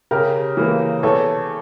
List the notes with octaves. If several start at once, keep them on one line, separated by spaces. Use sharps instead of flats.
C#3 G4 A#4
E3 A#3
E2 A4 C#5